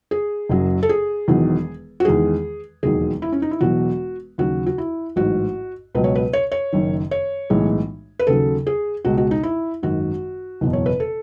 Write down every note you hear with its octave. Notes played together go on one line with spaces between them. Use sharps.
G#4
F#1 F#2 C#3 F#3
A4
G#4
E1 E2 D#3 F#3
F#4
E2 D#3 G#3 G#4
E1 D#2 D#3 F#3 G#4
E4
C#4
D#4
E4
E1 E2 B2 F#3 F#4
D#2 C#3 F#3 F#4
F#4
E4
A1 G#2 F#3 F#4
C#2 B2 F#3 B4
C#5
B4
C#5
C#5
F#1 F#2 D#3
C#5
B1 A2 E3 G#3
B4
D#2 C#3 F#3 A4
G#4
C#2 B2 G#3 F#4
F#4
D#4
E4
G#1 F#2 D#3 F#3 F#4
F#1 E2 B2
C#5
B4
A4